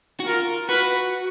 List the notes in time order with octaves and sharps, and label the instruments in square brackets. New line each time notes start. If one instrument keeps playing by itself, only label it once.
[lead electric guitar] F#4
[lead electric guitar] F4 [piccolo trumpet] A#4
[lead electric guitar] F#4 [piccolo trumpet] B4